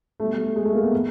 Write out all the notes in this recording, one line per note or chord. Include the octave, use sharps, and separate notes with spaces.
B2 G3 A3
A3
G#3
A3
A#3
B3
A2 F3